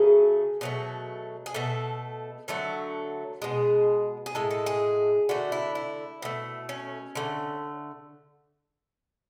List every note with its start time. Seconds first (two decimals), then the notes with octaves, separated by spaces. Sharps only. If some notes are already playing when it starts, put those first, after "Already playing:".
Already playing: C#3 F#3 A3 G#4
0.61 B2 F#3 A3
1.46 G#4
1.54 B2 A3 A4
2.48 D3 F#3 A3 A4
3.42 B2 G#3 G#4
4.26 G#4
4.35 A2 G#3 A4
4.51 A4
4.66 G#4
5.29 D3 A3 F#4
5.52 E4
5.75 E4
6.22 B2 A3
6.69 C#4
7.15 D3 A3